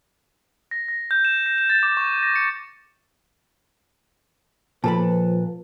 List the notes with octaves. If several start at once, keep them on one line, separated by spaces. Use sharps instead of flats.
A#6
A#6
G6
E7
A#6
E7
A6
D6
C#6
A#6
C#7
A#2 F3 A4 B4 A5 B5